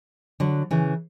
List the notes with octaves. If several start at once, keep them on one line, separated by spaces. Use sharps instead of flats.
D3 F#3
C#3 E3